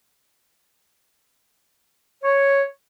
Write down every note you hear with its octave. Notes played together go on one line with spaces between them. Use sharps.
C#5